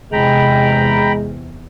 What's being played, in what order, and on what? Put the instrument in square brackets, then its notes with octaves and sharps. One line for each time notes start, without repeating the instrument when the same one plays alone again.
[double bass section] E2 C3 [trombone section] G#3 [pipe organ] G5 A#5 B5